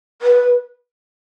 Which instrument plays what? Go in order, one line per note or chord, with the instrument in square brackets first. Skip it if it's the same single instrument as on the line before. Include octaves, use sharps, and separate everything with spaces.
[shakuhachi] B4